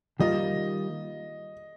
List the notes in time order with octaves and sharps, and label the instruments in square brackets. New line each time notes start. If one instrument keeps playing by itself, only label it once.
[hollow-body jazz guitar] D#3 G3 A#3 F4 [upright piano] D#5